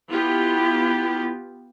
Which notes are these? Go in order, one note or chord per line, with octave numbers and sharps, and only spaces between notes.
B3 E4 F4 G4